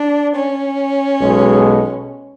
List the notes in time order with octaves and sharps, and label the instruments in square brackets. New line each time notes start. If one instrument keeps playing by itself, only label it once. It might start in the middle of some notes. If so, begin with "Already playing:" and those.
Already playing: [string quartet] D4
C#4
[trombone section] B1 B2 G#3